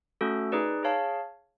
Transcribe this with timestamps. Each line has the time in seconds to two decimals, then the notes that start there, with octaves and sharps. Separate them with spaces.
0.21 A3 C#4 F#4 A4
0.52 D#4 G#4 B4 D5
0.83 G#4 C#5 F5 A5